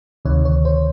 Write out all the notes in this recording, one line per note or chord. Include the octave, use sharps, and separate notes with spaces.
D2 C3 D#3 C#5
C#5
C5